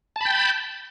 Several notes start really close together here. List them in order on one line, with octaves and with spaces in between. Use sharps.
A5 B5 G5